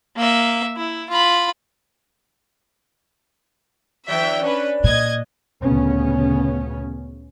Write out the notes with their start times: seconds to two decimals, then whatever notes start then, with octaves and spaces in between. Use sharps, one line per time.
0.17 A#3 E5
0.77 E4
1.09 F4 B5
4.08 D3 E3 F#3 E5 G5
4.43 C#4 D4 B4
4.84 A#2 D#5 G#6
5.62 D2 A#2 C#3 B3 C#4